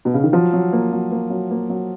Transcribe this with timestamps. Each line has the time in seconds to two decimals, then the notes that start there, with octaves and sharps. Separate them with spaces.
0.05 B2
0.14 C#3
0.24 D#3
0.32 F3 F#3
0.53 F#3
0.73 A#3
0.92 F#3
1.11 A#3
1.30 F#3
1.51 A#3
1.70 F#3